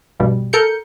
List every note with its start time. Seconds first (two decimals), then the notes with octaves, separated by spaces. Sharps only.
0.20 A#1 G2 B2 G3
0.53 A4 A#4 G6 C#7